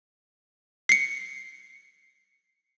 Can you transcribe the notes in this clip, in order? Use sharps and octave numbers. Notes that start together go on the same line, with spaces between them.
C7 C#7